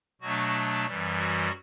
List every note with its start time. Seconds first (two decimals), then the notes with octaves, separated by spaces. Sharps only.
0.21 B2 F#3 A3 D4 F#4
0.86 F#2 E3 G3
1.18 F#4